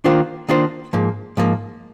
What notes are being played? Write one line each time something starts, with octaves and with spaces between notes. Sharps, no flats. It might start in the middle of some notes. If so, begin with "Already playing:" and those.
D#3 A#3 D4 F4 C5
D#3 A#3 D4 F4 C5
G#2 F3 A#3
G#2 F3 A#3